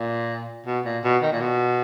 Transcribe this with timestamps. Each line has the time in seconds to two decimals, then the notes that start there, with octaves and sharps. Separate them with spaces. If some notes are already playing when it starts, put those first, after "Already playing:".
Already playing: A#2
0.67 B2
0.85 A#2
1.04 B2
1.23 D#3
1.32 A#2
1.41 B2